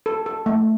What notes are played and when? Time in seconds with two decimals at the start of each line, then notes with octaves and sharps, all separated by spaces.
0.06 A4
0.26 A4
0.46 A3